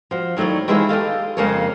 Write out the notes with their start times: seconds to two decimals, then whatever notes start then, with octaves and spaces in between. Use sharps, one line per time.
0.11 F3 F#4
0.37 D#3 F#3 A3 E4 D5
0.68 D#3 E3 G#3 F4 G#4 E5
0.89 G4 A4 D#5 F5
1.37 F2 C#3 G#3 A#3 A4 C#5